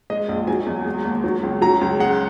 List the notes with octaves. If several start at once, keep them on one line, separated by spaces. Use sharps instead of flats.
G#3 D#5
A#1
F#3 G#5
E2
G#3
D#2
F#3
C#2
F#3 A#5
C#2
G#3 F#5